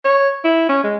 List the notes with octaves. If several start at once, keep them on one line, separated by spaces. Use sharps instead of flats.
C#5
E4
C#4
G#3